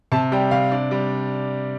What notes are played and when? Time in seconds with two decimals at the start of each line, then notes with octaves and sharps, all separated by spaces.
0.12 C3 A5
0.32 G3 G5
0.51 C3 F5
0.71 D4
0.91 G3